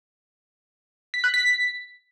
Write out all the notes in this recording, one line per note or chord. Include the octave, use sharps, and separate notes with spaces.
B6
F#6
B6